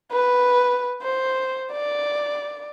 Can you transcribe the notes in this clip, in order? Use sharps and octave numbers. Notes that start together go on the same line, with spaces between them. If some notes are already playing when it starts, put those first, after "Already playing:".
B4
C5
D5